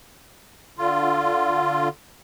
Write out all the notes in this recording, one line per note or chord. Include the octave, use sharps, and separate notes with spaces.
D3 F4